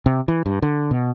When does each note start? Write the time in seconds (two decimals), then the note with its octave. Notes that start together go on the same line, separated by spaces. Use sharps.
0.06 C3
0.28 E3
0.46 G2
0.62 D3
0.91 B2